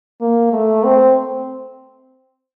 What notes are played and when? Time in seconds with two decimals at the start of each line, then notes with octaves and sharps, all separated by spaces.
0.21 A#3
0.53 A3
0.84 C4